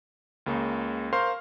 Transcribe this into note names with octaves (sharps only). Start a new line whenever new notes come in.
C#2 C#3 A#3
A#4 C5 F5 C6 C#6 F6